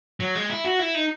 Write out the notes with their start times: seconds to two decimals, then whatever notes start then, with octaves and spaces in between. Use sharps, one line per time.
0.20 F#3
0.35 G#3
0.50 E4
0.65 F#4
0.79 E4
0.95 D#4